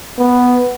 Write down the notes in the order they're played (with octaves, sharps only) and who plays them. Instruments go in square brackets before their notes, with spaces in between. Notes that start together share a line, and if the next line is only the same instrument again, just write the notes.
[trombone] B3